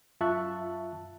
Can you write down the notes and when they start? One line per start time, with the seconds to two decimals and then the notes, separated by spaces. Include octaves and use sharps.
0.21 F#2 F4 E5 A5 C#6 F#6